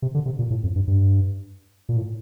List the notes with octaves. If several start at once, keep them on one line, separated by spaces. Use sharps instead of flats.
C3
D3
C3
A#2
A2
F2
G2
G2
A#2
A2